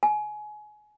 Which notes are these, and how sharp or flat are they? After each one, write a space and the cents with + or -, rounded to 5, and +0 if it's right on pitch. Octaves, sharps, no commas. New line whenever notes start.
G#5 +25